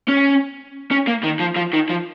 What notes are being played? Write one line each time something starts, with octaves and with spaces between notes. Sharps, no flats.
C#4
C#4
A#3
D#3
F3
F3
D#3
F3